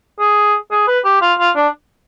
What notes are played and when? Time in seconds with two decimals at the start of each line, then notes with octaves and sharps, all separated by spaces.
0.20 G#4
0.71 G#4
0.87 B4
1.05 G4
1.22 F4
1.39 F4
1.56 D4